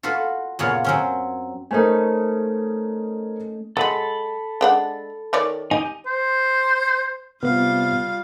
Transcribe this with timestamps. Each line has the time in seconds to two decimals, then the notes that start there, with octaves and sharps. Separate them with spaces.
0.03 F4 F#4 A4 B4
0.59 F#2 A#2 C#3 B3 F4 C#5
0.84 F#3 C4 C#4
1.71 A3 C#4 D#4 A#4 C5 G#5
3.77 F#3 G#3 A4 B5
4.61 G#3 D4 F#5
5.33 D#3 C#5 D5
5.71 D#4 G4 D#5 G#5
6.06 C5
7.43 C3 G3 B3 F4 F5